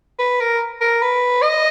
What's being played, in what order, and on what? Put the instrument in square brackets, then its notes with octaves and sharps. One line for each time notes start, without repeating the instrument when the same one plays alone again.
[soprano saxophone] B4
A#4
A#4
B4
D#5